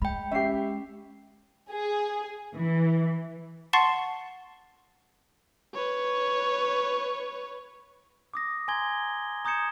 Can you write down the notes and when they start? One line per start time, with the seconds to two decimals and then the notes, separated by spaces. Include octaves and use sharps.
0.02 G#3 G5 B5
0.31 C#4 G4 E5 C7
1.71 G#4
2.55 E3
3.73 F#5 A5 C6 C#6 A6 C7
5.74 B4 C#5
8.34 D6 D#6 A#6
8.68 G#5 A#5 C6 G#6 G7
9.45 A#5 D#6 G6 G#6 C#7 E7